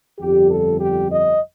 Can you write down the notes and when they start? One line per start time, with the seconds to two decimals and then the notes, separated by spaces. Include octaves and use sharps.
0.18 G1 F2 D3 G3 G4
0.49 A4
0.79 G4
1.09 D#5